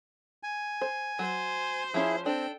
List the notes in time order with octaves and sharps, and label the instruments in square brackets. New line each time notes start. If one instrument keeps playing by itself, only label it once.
[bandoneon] G#5
[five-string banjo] C5
[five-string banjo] F#3 [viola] C5
[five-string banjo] F3 C#4 [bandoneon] E4 G#4
[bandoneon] C4 [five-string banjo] D4 [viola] A4 G5